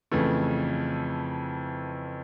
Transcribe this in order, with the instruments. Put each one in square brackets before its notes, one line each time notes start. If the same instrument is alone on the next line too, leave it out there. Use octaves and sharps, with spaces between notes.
[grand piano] F2 C#3 E3 A3